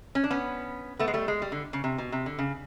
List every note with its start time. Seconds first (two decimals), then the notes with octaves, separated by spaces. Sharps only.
0.15 C#4
0.24 D4
0.30 B3 C#4
0.99 A3 B3
1.08 G#3
1.14 G3 A3
1.28 G#3
1.42 G3
1.52 D3
1.73 C#3
1.84 C3
1.98 B2
2.12 C3
2.26 D3
2.39 C#3